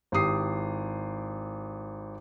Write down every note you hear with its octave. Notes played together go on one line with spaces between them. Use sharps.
G#1 E4 G4 D#6 C7